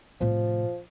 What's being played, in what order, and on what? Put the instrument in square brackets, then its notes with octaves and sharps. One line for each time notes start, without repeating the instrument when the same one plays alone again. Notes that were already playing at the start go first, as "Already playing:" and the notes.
[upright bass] A2 C3 [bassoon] F3